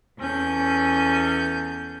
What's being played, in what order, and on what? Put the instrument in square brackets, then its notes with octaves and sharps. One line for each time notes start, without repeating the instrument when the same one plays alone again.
[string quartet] E2 C#4 A4 G6